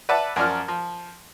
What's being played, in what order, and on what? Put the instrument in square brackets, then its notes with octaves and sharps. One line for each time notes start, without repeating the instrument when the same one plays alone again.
[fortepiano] B4 D5 E5 F#5 A5
F#2 F3 A#4 D5 A#5 F6
F3